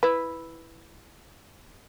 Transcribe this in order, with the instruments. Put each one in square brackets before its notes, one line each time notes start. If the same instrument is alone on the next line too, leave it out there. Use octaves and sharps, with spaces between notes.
[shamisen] E4 B4